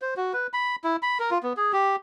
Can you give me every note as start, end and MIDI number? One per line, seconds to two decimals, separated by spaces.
0.02 0.14 72
0.17 0.33 66
0.33 0.47 71
0.53 0.76 83
0.84 0.96 64
1.03 1.18 83
1.20 1.30 70
1.31 1.38 65
1.43 1.53 59
1.57 1.72 68
1.73 1.96 67